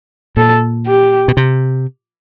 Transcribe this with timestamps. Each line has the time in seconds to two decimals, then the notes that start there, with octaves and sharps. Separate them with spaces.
0.37 A#2 A4
0.87 G4
1.28 B2
1.37 C3